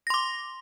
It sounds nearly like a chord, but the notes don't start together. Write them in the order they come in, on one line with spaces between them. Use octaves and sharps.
A#6 C6 D6